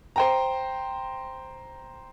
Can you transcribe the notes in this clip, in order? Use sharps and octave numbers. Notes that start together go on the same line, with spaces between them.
C5 G5 A#5